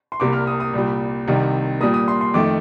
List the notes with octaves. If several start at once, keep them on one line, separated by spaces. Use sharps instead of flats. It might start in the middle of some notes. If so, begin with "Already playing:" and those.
C6
C2 C3 G3 A#3 D6
F6
D#6
D#6
C2 A#2 G3
C2 C3 D#3
A#2 G3 A#3 D#6
D#6
C6
C6
F2 D#3 A3 D6